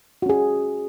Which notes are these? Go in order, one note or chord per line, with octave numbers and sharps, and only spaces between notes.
C#4 F#4 G#4